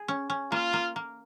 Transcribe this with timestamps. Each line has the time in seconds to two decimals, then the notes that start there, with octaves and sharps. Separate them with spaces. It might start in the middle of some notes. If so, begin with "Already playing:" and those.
Already playing: G#4
0.08 C#4
0.30 C#4
0.52 A#3 F4
0.73 A#3
0.96 A#3